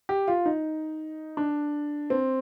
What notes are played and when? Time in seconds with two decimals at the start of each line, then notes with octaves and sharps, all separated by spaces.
0.09 G4
0.28 F4
0.46 D#4
1.37 D4
2.10 C4